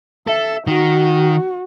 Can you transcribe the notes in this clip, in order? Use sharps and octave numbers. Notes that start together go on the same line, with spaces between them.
A4 E5
D#3 F#4